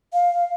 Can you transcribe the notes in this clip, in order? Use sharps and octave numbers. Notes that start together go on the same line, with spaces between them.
F5